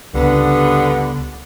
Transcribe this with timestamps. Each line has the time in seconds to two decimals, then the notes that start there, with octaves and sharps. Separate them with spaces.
0.14 C#2 G2 D3 B3